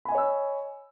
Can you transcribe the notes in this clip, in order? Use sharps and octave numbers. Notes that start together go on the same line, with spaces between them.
C#5 D#5 G#5 B5 E6